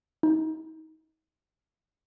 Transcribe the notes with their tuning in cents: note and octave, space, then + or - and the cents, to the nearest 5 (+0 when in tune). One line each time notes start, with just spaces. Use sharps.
D#4 +35